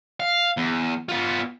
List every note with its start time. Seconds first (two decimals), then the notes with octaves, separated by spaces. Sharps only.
0.20 F5
0.57 E2
1.09 B3 F4